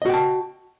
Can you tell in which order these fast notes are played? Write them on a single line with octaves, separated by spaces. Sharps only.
D#5 F#4 G5 A5